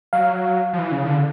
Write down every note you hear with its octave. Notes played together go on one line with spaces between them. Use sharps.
F#3 F5
F3
E3
C#3
D3